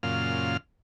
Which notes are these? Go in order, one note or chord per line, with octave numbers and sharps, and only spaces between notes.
F#2 A#2 C#3 F4 F6